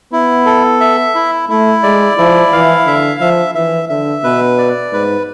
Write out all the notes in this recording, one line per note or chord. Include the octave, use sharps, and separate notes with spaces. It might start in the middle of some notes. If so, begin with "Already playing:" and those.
B3 E4
A4
E5
E4
A3 E4
G#3 D5
F3 E4
E3 F5
D3 E5
F3 E5
E3 E5
D3 E5
B2 B4
D5
G#2 B4